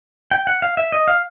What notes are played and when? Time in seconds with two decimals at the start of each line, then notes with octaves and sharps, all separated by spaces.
0.31 G5
0.47 F#5
0.62 F5
0.77 E5
0.92 D#5
1.08 F5